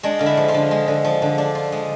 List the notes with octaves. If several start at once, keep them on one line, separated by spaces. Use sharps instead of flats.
G#3 D4 D5
D3 F5
E4 E5
F3
F4 F5
D3
G#3
D3
F3
D3
D4
F4
G#3